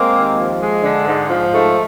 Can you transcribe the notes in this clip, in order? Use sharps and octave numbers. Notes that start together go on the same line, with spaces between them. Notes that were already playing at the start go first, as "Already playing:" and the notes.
Already playing: G#3 A#3 C4
D#2
F3
G#3
D3
G#2
F3
G#2 A3